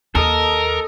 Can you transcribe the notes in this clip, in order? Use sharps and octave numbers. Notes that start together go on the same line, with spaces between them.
D#2 A4 A#4 D#5